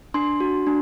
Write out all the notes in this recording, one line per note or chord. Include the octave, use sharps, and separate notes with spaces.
D4 C6
F#4
D4